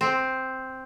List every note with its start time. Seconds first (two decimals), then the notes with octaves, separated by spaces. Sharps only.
0.01 C4